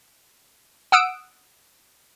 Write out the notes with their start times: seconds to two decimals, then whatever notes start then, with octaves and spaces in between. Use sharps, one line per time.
0.92 F#5 D#6 E6 D7